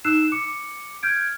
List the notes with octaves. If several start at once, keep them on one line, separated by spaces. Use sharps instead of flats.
D#4 E6 F#6 C7 E7
D6 C#7
F6 G6 G#6 D7